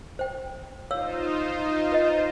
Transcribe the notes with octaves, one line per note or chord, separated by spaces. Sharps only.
C5 G5
D#4 F4 C5 C#5 F5 E6
B4 D#5